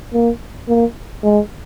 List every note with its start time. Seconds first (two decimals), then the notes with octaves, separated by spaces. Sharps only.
0.13 A#3
0.68 A#3
1.23 G#3